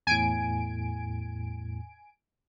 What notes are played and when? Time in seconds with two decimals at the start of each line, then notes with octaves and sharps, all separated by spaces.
0.07 E2 A2 G#5 D7